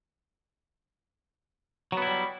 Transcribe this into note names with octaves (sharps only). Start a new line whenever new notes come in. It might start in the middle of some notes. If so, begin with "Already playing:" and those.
F#3 G3 B3 E4